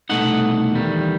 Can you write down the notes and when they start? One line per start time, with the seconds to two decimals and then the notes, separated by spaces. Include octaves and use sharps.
0.09 C2 B2 A3 D#4 F#5
0.72 E2 D#3 G3